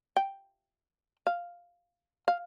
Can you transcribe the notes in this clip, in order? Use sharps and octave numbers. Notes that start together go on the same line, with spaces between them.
G5
F5
F5